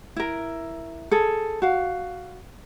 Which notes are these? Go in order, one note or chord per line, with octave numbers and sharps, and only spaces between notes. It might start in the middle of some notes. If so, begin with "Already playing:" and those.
E4 A#4
G#4 A4
F#4 F5